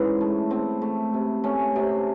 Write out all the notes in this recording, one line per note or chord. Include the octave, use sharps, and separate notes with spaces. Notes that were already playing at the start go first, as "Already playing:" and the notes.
Already playing: G#2 E3 C#4
A3
A3 C4
A3
C3
A3 C#4
C3